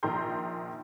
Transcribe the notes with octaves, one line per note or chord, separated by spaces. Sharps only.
A#1 D#3 G5 A#5 C6 G6